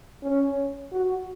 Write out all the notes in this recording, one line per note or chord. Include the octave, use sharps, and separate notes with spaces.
C#4
F#4